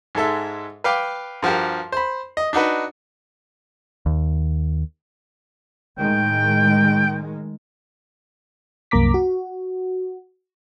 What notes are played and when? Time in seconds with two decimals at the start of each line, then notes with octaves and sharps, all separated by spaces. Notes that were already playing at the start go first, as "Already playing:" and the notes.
0.15 G#2 G#3 A4 E5
0.84 B4 F5 G5 D6
1.43 G2 F3 F#4 G4 A#4
1.92 C5 B5
2.37 D#5
2.53 D4 D#4 F#4 B4
4.06 D#2
5.98 A2 D#3 G#3 G5
8.91 C2 F#2 A#3 A#5 D6 B6
9.14 F#4